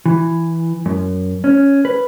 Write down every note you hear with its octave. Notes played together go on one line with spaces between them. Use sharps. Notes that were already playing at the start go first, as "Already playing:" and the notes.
E3
F#2
C#4
B4